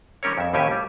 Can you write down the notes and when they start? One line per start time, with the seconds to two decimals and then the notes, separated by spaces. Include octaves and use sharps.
0.23 D#3 G3 C#4 A#4 C#5
0.38 F2 E5
0.53 D#2 A2 C#4 G4 E5 G#5
0.71 G3